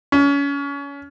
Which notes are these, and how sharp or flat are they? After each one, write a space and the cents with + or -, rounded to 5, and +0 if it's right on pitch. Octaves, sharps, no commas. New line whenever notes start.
C#4 +30